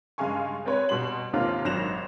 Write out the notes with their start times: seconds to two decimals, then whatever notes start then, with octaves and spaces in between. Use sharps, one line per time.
0.18 G2 C#3 G#3 F5 G#5 C#6
0.65 G#3 C4 B4 C#5
0.89 B2 G3 C6 F#7
1.33 D#2 G#2 C3 A#3 F4 F5
1.65 G#1 G#2 F#3 A#6 E7 F7